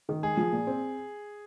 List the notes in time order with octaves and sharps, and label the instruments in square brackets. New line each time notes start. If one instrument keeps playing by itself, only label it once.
[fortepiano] D#3
[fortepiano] G#3 [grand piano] G#4
[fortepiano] F3
A#2
C4